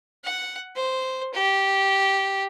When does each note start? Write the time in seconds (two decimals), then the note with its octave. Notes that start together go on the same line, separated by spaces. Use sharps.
0.24 F#5
0.76 C5
1.34 G4